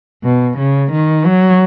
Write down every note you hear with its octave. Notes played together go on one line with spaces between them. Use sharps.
B2
C#3
D#3
F#3